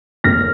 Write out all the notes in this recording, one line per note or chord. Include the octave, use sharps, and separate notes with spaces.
F1 D#2 C#3 A#3 F6 A#6